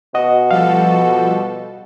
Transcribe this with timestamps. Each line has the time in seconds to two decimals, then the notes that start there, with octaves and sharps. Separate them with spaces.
0.15 B2 F#4 D#5
0.51 F3 G3 A4 F5